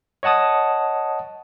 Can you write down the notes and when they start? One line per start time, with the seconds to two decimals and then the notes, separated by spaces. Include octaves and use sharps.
0.23 C#5 D#5 F#5 A5 D#6